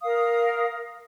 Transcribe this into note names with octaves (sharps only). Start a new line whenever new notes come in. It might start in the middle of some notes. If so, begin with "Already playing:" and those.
A#4 F5 D#6